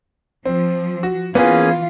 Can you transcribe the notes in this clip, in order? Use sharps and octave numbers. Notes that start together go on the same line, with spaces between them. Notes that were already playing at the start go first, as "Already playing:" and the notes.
F3 C4
F#4
E3 A#3 B3 C#4 F4 G#4